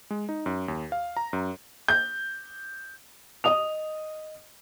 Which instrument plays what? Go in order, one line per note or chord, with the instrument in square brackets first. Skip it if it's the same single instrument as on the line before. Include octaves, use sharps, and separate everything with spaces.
[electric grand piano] G#3
D#4
F#2
D#2
F5
A#5
F#2
[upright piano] G6
D#5 D#6 F7